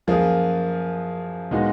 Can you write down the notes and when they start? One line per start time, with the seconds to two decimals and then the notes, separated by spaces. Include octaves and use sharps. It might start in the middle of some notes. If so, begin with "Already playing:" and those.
0.07 F#2 F3 A#3 F4 G#4
1.51 A#2 G#3 B3 D#4 F#4